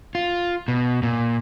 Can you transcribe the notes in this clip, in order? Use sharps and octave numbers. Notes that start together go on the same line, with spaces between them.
F4
B2
A#2